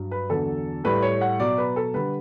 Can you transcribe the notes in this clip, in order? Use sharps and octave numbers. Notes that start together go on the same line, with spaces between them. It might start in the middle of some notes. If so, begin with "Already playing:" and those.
Already playing: G2 F#3
B4
E2 D3 F#3 A4
A2 G3 B4
C#5
F#5
B2 F#3 D5
B4
A4
D3 G3 B4